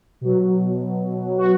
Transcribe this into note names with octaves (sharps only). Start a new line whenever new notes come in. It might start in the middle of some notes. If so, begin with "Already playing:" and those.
B2 F#3
F#4